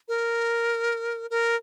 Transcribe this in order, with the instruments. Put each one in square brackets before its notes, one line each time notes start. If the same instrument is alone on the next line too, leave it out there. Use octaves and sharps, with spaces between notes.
[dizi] A#4
A#4